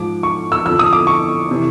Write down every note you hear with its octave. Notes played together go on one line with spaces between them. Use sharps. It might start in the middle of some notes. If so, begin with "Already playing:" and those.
Already playing: G#2 F3 D6
C#6
E6
F2 D3 F3 E6
D#6
D6
C#6
C3 E3